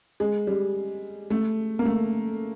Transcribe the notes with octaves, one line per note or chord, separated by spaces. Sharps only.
G#3
G3
A3
A#3
A3